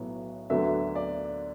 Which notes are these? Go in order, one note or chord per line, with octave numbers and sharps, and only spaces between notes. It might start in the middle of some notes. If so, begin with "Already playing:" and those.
Already playing: B1 A2 F#3 B3
D2 D3 F#3 B3 E5
D5